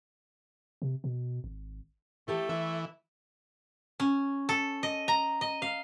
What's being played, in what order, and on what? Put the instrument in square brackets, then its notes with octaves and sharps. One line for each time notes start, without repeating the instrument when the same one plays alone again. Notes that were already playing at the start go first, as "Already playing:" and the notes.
[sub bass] C3
B2
G#1
[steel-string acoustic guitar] E3 G4 A4 [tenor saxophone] A3
[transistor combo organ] E3 [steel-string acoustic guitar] E5
[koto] C#4
A4
D#5
A#5
D#5
F5